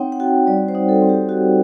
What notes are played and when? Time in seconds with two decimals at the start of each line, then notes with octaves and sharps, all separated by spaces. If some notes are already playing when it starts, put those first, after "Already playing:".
Already playing: C4 D#4 C#5 F#5 G5
0.12 F#5
0.20 F#4 G5
0.47 G3 D5
0.68 C5
0.75 D#4
0.89 A4
1.02 C4
1.09 G4
1.29 F#4